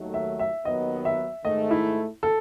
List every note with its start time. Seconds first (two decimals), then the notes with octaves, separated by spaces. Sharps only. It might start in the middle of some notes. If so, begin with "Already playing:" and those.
Already playing: D#2 D#3 F#3 A3
0.14 E5
0.39 E5
0.65 D#2 D#3 F#3 B3 D#5
1.05 E5
1.44 G#2 D#3 A3 D#5
1.71 E4
2.23 A4